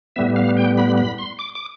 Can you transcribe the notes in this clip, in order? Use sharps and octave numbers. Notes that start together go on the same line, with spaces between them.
A2 G3 B3 E5
F5
G5
B5
B5
C6
D6
D6